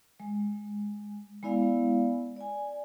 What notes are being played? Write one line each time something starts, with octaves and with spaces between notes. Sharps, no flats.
G#3
G#3 B3 E4 D5 F5
D5 G#5